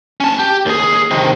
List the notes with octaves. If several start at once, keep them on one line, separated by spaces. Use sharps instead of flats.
C#4 A5
G4
D#2 G#4
C3 D#3